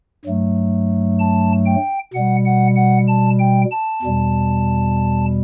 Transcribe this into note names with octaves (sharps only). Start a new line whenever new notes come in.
G2 F#3 A3
A5
G5
B2 G3 F#5
F#5
F#5
A5
G5
A5
E2 B2 G3